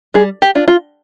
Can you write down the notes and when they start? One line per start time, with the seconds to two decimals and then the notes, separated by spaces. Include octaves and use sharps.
0.14 G3 G#4
0.42 G4
0.55 D4 F4
0.68 F4